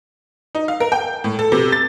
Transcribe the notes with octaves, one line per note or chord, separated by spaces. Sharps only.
D#4
F5
A#4
G5
A2
A4
C3
A6